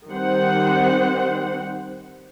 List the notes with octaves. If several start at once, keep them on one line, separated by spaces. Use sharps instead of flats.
D#3 G3 C4 C5 F#5